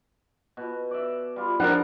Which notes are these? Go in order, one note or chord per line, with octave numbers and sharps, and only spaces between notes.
B2
D5 E5
G3 F4
F3 D4 A#4 F#5